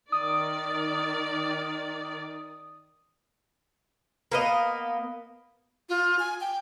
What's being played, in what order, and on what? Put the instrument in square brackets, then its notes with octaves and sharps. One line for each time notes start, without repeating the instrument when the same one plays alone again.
[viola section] D#3 D5 [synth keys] D#6
[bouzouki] A#3 B3 D#5
[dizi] F4
G#5
G5